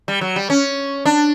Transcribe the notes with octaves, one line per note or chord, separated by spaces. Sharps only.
G3
F#3
G3
C#4
D4